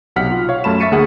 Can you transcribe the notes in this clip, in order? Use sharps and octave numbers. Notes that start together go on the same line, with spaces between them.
B1 C3 F#5 F6 B6
F4
C#5 F5
F#2 A3 A5 B5 E7
E5 C#6 A6 B6 C#7 D#7
D2 A#3 G#4 F#5